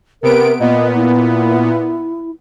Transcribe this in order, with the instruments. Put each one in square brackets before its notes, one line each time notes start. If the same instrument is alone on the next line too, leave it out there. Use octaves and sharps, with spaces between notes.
[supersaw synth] C3 B3 D7 [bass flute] A#4
[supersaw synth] A#2 B3 [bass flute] D#5
[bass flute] E4